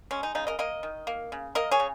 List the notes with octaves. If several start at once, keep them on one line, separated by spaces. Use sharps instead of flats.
G#3 C#4
D#4
C#3 D#4
A#4 D#5
A#3 A#4 D#5
D#3
A#3
C#3
A#3 A#4 D#5
G#4 C#5
C#3